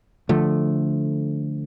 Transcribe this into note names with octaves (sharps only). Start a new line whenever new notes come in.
D3 F3 A3